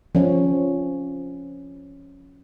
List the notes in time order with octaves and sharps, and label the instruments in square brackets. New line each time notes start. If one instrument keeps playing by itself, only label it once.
[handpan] F3 C#4